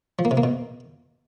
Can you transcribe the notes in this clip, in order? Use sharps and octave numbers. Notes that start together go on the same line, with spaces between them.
F3
A#3
C3
A#3
B2